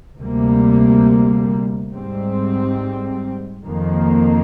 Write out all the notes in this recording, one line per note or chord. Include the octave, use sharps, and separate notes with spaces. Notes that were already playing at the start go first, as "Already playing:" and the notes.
D2 C3 G3 A#3
G#2 G3 C4
F2 D#3 A#3